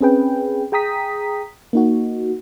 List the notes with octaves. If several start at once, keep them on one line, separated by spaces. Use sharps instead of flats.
C4 C#4 G#4 B4 G5
G#4 G5 A#5 D#6 B6
A#3 D#4 F#4